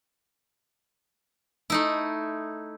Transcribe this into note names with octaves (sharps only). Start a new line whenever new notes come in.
A3 D#4 E4